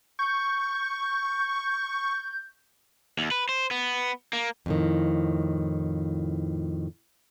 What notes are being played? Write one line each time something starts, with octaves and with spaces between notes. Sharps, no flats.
C#6 G6
D#2
B4
C5
B3
A#3
F2 A2 D#3